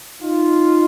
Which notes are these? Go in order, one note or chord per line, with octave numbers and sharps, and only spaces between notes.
D#4 F4